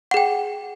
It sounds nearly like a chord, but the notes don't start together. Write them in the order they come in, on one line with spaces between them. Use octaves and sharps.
F#5 G#4 G5